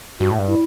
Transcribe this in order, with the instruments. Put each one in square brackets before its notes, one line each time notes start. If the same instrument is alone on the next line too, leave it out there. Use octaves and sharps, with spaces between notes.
[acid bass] G2 [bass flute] F#4
[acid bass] A2
G2
[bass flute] E4